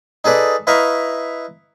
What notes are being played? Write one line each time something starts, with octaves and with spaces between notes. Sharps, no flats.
D#4 G#4 A4 B4 D5
E4 B4 D#5 F5 A#5 C#6